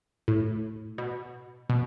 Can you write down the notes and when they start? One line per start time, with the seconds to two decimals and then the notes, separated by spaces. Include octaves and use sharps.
0.28 A2
0.98 B2
1.70 B2